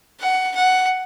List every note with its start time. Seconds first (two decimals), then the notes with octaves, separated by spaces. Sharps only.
0.20 F#5
0.56 F#5